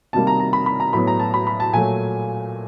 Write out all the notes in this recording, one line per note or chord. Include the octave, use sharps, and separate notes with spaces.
C3 D#3 G3 A#3 A5
A#5
A#5
B5
B5
A#5
A2 F#3 B3 B5
A#5
A5
B5
B5
A5
A#2 F#3 A3 G#5